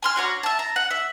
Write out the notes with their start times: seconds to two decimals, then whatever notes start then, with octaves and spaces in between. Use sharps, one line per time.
0.03 G#5 C6 F6
0.16 D4 F#4 C#5 A#5
0.43 E5 A5
0.59 A#5
0.76 F#5
0.90 E5